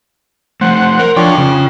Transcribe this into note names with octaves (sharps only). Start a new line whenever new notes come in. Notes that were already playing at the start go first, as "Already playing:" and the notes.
F3 A3 C5 F#5
A#4
F3 D4 F4 C#5 G5
C#3